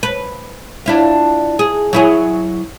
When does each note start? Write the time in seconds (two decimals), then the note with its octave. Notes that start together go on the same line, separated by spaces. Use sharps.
0.03 B4
0.86 D4 E4 F4
1.59 G#4
1.93 F#3 E4 G#4